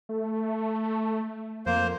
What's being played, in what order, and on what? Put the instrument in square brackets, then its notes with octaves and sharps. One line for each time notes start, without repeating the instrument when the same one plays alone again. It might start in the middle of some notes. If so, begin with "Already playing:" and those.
[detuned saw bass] A3
[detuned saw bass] F2 [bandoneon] A#3 C5